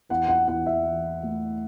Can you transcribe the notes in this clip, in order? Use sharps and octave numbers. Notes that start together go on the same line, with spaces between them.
E2 F#5
F#5
E2 F#5
E5
E3
A3